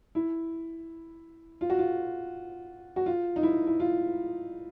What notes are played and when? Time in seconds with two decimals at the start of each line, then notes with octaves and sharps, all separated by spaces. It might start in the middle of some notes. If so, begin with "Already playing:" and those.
0.15 E4
1.61 F4
1.70 F#4
1.79 F4
2.96 F#4
3.06 F4
3.36 D#4
3.43 E4
3.67 E4
3.80 F4